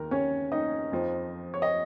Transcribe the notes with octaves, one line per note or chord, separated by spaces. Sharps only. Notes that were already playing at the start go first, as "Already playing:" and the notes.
Already playing: D#2 D#3 A#4
C#4 C#5
D#4 D#5
F2 F3
C#5
D#5